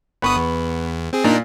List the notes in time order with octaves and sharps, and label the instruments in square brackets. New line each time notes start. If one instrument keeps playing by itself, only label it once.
[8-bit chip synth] G1 B4 D#6 [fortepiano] B3 B5 C#6
[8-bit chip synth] E2
C4 G#4
[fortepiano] A#2 [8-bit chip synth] D4 D#4 A#4